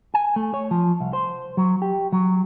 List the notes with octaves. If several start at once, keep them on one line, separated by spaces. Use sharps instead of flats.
G#5
A3
C#5
F3
C2
C5
F#3
G4
F#3